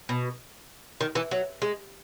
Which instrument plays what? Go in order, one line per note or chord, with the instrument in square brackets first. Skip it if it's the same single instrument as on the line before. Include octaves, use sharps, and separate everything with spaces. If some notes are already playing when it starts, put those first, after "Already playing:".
[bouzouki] B2
D#3
E3
F#3
G#3